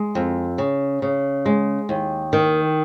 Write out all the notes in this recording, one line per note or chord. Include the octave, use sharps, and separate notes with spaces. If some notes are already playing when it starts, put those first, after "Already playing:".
Already playing: G#3
F2
C#3
C#3
G#3
D#2
D#3